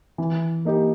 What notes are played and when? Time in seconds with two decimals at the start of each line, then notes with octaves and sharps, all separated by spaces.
0.18 E3
0.65 A#3 D#4 G4